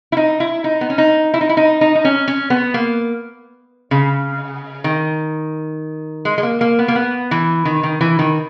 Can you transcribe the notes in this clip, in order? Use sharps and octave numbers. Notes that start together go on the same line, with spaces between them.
E4
D#4
E4
D#4
B3
C#4
D#4
E4
D#4
E4
D#4
D#4
D#4
C#4
C#4
B3
A#3
C#3
D#3
G#3
G#3
A#3
A#3
B3
A#3
B3
E3
D#3
D#3
E3
D#3